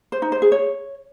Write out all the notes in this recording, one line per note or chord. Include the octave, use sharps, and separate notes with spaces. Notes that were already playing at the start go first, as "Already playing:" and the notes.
C5
D#4
C5
G#4
C#5